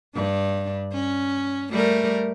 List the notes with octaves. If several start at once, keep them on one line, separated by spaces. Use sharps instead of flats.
G2 D4
C#4
G3 A3 A#4